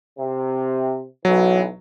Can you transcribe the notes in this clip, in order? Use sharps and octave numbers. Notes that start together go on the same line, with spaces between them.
C3
B1 E3 F#3